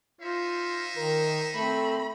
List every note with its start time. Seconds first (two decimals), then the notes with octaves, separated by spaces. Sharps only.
0.21 D#4 F4 C5 E5
0.97 D#3 A#4
1.55 A3 C4 B5